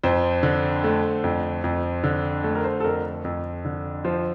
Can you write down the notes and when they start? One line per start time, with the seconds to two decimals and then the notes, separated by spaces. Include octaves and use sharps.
0.03 F2 C5
0.43 D3
0.84 A3
1.24 F2
1.64 F2
2.04 D3
2.44 A3
2.55 A#4
2.64 C5
2.80 A4
2.84 F2 A#4
3.25 F2
3.65 D3
4.04 F3 C5